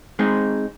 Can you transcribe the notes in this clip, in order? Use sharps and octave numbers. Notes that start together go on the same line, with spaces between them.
G#3 C4 D#4 G#4